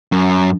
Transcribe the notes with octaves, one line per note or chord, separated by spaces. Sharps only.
F#2